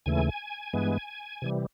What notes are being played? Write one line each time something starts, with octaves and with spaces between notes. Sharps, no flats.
D#2 C#3 E3 A3 G#5
G2 E3 G#3 B3
C3 E3 G3